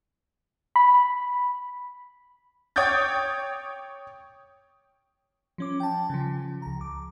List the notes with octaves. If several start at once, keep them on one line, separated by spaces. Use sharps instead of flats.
B5
C#5 G5 D6 D#6 G6 A6
F3 C#4 D6
G5 A5
C#3 F3
C#2 A#5
D6